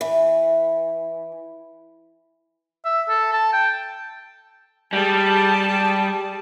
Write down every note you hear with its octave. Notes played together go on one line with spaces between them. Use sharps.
E3
E5
A4
A5
G5
G3 G4 G#4 A5